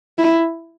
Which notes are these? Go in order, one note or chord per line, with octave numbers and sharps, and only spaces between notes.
E4